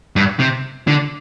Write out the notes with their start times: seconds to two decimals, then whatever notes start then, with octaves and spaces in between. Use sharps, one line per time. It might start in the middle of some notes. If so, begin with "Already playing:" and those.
0.16 G2
0.40 C3
0.87 D3